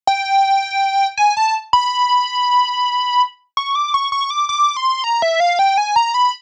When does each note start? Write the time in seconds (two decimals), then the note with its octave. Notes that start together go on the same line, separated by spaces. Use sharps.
0.07 G5
1.17 G#5
1.37 A5
1.73 B5
3.57 C#6
3.75 D6
3.94 C#6
4.12 C#6
4.30 D6
4.49 D6
4.77 C6
5.04 A#5
5.22 E5
5.40 F5
5.59 G5
5.78 G#5
5.96 A#5
6.14 B5